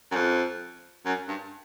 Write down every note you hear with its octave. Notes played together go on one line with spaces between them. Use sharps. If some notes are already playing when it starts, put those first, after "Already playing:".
F#2
F2
F#2
G2